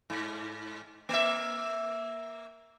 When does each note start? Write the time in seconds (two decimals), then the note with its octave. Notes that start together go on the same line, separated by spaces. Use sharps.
0.10 G#2
1.09 A#3 E5